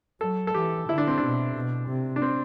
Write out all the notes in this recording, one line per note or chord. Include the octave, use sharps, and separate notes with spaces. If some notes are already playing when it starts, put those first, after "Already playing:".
F#3 A4
A4
E3 G4
D3 E4
D4
C4
B2 D4
B2
C3
D4
C4